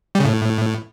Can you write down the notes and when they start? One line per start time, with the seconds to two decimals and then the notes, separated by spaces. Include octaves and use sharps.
0.15 G3
0.20 C#3
0.25 A2